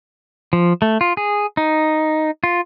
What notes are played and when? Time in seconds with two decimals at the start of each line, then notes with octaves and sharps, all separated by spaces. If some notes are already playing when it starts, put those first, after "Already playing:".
0.53 F3
0.82 A3
1.01 F4
1.17 G#4
1.57 D#4
2.44 F4